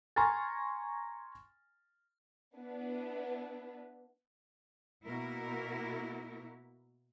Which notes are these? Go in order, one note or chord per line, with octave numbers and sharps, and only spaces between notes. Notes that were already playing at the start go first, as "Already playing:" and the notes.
G#5 A#5 C6 C#6 F6 A6
B3 D4 E4 B4
B2 A#3 E4 F#4 A#4